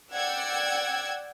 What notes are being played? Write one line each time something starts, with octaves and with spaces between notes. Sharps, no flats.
D5 F#5 G5 E6 G#6